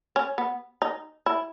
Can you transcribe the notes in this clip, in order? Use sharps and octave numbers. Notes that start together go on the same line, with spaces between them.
C#4
B3
D#4
E4